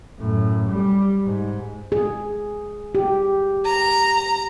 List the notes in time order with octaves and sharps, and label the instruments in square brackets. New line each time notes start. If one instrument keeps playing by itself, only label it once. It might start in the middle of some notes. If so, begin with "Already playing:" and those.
[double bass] F#2 A2
G3
G#2
[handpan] G#4
G4
[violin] A#5